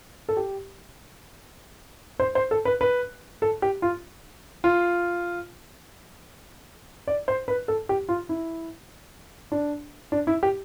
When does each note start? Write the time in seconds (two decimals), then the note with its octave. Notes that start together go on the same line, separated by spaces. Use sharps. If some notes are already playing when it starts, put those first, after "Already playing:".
0.29 A4
0.37 G4
2.20 C5
2.35 C5
2.51 A4
2.65 B4
2.81 B4
3.42 A4
3.62 G4
3.82 F4
4.64 F4
7.08 D5
7.28 C5
7.48 B4
7.68 A4
7.89 G4
8.09 F4
8.29 E4
9.52 D4
10.12 D4
10.27 E4
10.43 G4